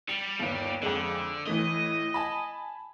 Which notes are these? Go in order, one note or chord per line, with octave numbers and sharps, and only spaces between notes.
G3 C#7
G1 D#2
F2 D3 G#3
A2 E3 A3 D#5
G#5 A5 B5